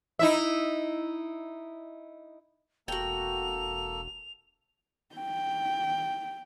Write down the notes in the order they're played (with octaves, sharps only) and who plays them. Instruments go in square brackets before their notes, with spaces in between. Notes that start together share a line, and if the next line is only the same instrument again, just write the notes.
[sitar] D#4 E4 E5
[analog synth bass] E1 [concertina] A#3 A4 [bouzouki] F#4 G5 [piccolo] F7
[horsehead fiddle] G5